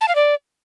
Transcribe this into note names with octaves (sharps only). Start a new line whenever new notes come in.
A5
F5
D5